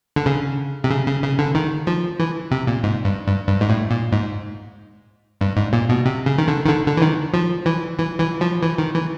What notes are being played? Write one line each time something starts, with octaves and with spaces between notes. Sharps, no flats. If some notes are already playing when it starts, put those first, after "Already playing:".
D3
C#3
C3
C#3
C#3
C#3
D3
D#3
F3
E3
C3
A#2
G#2
G2
G2
G2
G#2
A2
A#2
G#2
G2
G#2
A#2
B2
C3
C#3
D#3
D3
D#3
D3
D3
E3
D#3
F3
E3
E3
E3
F3
E3
D#3
E3